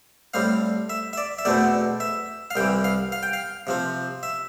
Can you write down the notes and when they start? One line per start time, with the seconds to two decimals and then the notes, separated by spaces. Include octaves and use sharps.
0.34 A2 G3 C4 F5
0.90 E5
1.13 E5
1.18 D5
1.39 E5
1.45 E2 B2 A3 C4 D5
2.00 E5
2.51 F5
2.56 C2 C3 E3 G5
2.84 F5
3.12 F5
3.23 G5
3.33 F5
3.67 C3 F3 C4
4.23 E5